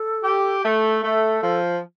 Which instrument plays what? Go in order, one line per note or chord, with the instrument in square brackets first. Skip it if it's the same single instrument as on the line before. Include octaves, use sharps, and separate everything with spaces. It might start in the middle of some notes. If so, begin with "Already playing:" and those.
Already playing: [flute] A4
[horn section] G4
A3
[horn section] A3 [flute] A4
[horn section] F3